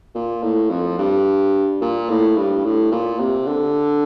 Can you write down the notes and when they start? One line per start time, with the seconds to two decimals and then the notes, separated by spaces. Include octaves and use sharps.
0.15 A#2
0.43 A2
0.70 F2
0.98 G2
1.81 A#2
2.09 A2
2.37 G2
2.65 A2
2.92 A#2
3.20 C3
3.47 D3